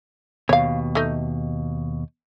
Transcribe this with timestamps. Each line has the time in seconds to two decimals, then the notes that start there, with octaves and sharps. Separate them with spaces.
0.49 D#2 B2 C#5 F5
0.95 A3 D#4